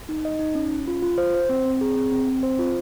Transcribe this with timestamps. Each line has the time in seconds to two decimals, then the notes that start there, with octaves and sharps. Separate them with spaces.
0.09 D#4
0.25 D#5
0.39 D#4
0.55 C#4
0.72 C#4
0.88 F4
1.02 F4
1.18 C5
1.34 C5
1.49 C4
1.65 C4
1.81 G#4
1.97 C4
2.12 C4
2.28 C4
2.43 C5
2.59 F4